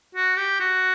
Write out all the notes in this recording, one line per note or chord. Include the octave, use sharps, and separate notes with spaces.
F#4
G4
F#4